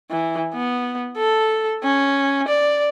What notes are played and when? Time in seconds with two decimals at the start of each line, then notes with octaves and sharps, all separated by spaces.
0.11 E3
0.54 B3
1.18 A4
1.84 C#4
2.48 D5